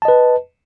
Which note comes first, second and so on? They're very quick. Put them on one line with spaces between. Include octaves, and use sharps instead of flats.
A5 D#5 B4